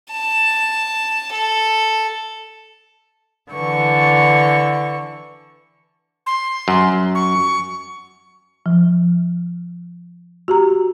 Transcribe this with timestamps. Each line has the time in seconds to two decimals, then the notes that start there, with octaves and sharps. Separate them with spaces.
0.11 A5
1.32 A4
3.52 D3 E3 C#6
6.26 C6
6.68 F#2
7.15 C#6
8.66 F3
10.48 F#4 G4 A#5